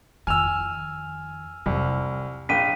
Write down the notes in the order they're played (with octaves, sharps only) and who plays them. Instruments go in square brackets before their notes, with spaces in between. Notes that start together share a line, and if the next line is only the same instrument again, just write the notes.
[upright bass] F2 D#3 [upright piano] G#5 E6 [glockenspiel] F6 F7
[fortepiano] C2 [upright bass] F2 E4
[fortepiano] A#1 [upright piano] G5 [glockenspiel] B6 D#7